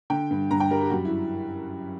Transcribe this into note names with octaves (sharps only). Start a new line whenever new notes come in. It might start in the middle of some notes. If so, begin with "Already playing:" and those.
D3 G5
G2
G2 A#5
G5
G3 A#4
G4
F#2 F#4
E4